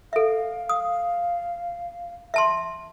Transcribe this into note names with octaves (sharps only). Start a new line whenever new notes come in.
A4 E5 F5
D#6
E5 A5 C6